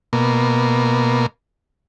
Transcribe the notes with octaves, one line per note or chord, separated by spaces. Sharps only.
B2 A#3